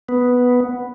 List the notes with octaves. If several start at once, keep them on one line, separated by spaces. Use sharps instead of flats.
B3